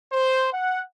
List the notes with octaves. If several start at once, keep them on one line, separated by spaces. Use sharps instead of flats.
C5
F#5